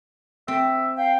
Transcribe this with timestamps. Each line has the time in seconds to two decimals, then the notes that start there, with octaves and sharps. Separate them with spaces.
0.48 C4 E5
0.98 F5 G5